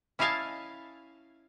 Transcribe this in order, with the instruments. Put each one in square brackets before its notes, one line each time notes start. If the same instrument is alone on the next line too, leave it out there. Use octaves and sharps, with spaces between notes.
[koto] C#4 E4 D#5 F5 G#5 A5